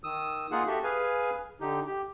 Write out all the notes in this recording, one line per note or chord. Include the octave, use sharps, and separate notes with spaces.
D#3 D#6 E6
A#3 D#4 F4 G#4 F#5
F#4 G4 A4 E5
G#4 B4 F5 G#5
D3 D#4 G4
G4